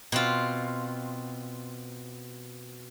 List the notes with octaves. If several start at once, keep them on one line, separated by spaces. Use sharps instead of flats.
B2 C4 F4